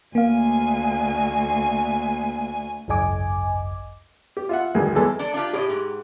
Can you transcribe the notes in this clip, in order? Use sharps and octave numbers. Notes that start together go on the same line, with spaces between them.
D2 A#3 F5 G#5
G#1 C#2 F#2 D#5 G#5 D6
G4
F4 E5 F#5
D2 G2 D#3 G#3
E2 G#3 A4 B4
D4 A4
D4 F4 G4
A2 G4 D5 D#5
G#2